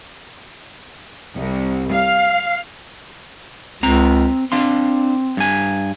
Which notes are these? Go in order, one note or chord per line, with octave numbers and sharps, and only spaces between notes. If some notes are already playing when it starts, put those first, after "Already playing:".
C2
F5
C#2 C4 A#5
C4 D4 F5 C6
G2 G#5